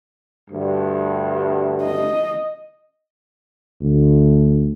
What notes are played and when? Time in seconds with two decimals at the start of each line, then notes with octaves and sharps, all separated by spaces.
0.51 D2 G2
1.82 D#5
3.82 D2